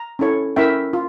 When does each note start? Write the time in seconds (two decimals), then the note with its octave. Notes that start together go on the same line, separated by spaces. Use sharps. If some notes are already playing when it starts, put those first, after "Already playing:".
Already playing: A#5
0.19 C#4 E4 A4 C#5
0.56 C#4 E4 A#4 E5 G5
0.93 F4